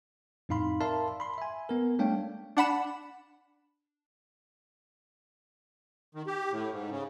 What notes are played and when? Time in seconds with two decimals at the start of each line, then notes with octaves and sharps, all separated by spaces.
0.49 F2 A2 D#4 F5 B5 C6
0.81 A#4 D5 E5 F5 A5 C6
1.20 B5 C6
1.38 E5 G#5
1.69 B3 A#4
1.99 G3 A3 D4 C#5 F5 G5
2.57 D4 F#5 B5 E7
6.15 D#3
6.27 G4
6.52 A2
6.72 G#2
6.90 C#3